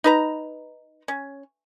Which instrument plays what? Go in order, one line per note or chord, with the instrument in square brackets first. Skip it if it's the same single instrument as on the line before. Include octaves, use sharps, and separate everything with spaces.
[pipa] D#4 B4 A#5
C#4